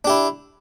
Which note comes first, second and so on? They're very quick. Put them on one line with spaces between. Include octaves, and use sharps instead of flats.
D4 G4 E4